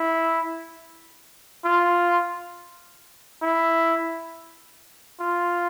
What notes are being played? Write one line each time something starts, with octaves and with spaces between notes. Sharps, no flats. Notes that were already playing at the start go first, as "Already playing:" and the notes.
Already playing: E4
F4
E4
F4